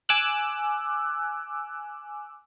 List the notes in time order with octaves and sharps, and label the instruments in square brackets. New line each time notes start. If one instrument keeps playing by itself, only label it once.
[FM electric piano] G#5 D6 E6 F#6